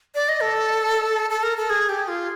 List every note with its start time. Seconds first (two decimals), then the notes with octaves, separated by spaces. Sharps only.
0.15 D5
0.29 D#5
0.42 A4
1.30 A4
1.43 A#4
1.57 A4
1.70 G#4
1.89 G4
2.08 F4